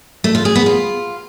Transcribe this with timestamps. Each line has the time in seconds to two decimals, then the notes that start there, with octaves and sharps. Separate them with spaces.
0.24 A3
0.35 F4
0.45 G#4
0.56 B3
0.66 F4